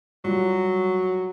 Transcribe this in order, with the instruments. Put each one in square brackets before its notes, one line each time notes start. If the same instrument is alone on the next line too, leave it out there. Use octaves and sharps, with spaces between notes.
[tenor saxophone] F#3 [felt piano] G3 F4